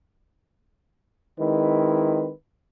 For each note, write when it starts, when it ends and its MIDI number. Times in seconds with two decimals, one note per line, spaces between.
1.39 2.31 51
1.39 2.31 56
1.39 2.31 60
1.39 2.31 64
1.39 2.31 71